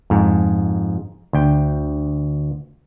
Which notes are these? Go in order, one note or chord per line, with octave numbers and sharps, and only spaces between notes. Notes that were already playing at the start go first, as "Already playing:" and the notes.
F2 G#2
D2 G5